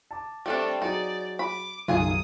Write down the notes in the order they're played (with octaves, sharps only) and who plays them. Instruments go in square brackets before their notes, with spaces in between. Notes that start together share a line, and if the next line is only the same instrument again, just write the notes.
[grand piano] A5 D6
[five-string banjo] G3 A3 D4 [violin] C4 A4
[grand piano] F#3 F#4 G#4 [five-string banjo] D#4 [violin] D5
[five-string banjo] B5 [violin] D6
[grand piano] B1 F#2 D#3 [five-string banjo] F4 G#4 G#5 [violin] D#6